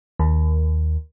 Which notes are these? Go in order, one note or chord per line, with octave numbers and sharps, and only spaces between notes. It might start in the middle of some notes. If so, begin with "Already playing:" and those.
D#2